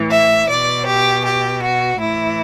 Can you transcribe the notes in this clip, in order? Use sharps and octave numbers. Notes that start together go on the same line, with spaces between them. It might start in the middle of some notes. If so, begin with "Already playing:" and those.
Already playing: A2 E3
E5
B2 D5
G4
G4
F#4
A2 E4
E3